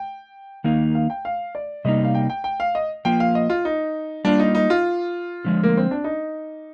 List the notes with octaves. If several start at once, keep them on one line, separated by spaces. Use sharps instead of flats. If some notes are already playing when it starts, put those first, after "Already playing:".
Already playing: G5
D#3 A#3 D#4 F5
F5
G5
F5
D5
C3 G3 A#3 D#4 D#5
F5
G5
G5
G5
F5
D#5
F3 A#3 F4 G5
F5
D#5
F4
D#4
G3 A#3 D4 F4
D#4
D#4
F4
D3 F3 G#3
A#3
C4
D4
D#4